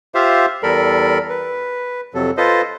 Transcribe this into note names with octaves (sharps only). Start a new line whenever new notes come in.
F4 G4 C5 E5 F5
E2 G3 A4 A#4 B5
B4
F2 C3 F#3 A4
F4 A4 B4 C5 D#5